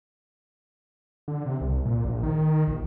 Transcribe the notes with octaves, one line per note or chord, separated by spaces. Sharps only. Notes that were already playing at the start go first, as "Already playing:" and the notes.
D3
C3
C2
A#2
A#1
D#3
A#1